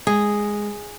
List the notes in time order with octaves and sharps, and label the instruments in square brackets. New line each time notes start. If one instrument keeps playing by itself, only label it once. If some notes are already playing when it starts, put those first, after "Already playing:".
[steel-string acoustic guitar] G#3 [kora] G#4